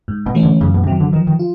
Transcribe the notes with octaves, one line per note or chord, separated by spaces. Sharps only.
G#2
B2
E3 A3 C#4
D3
F#2 C#3
B2
C#3
C3 D#3 F#3
D3
D#3 F3
D#3
F4